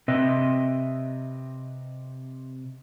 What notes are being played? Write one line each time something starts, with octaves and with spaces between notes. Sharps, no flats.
C3 C4 B4 D#5 E5